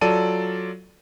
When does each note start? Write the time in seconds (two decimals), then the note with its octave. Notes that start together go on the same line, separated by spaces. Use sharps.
0.01 F#3 F4 A4 D5 A5 D#7